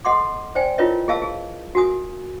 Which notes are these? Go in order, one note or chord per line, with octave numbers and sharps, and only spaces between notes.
A4 D#5 F#5 C6 D6
C5 D5 G5 G#5
E4 F4 A#4 B4 C#5 D#5
G#4 A#4 D#5 F5 A5 E6
G#4
F#4 A#4 G#5 D#6